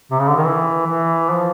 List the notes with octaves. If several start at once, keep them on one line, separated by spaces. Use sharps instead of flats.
C3
C#3
D3
D#3
E3
E3
F3